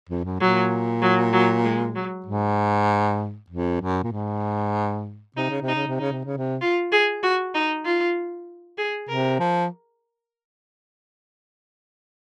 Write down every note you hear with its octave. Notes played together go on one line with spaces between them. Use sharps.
F2
F#2
A#2 F#3
F#3
F#3
G#3
F#3
G#2
F2
F#2
A#2
G#2
C3 D#4
C#3
C3
D#4
C#3
C3
C#3 D#4
C3
C#3
C3
F4
G#4
F#4
D#4
F4
G#4
C3 A#4
F3